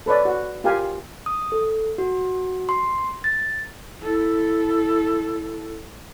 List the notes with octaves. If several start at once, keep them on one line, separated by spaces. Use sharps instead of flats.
A4 B4 C#5 D5
F#4
F4 G4 A#4 F5 G#5
D#6
A4
F#4
C6
A6
E4 A4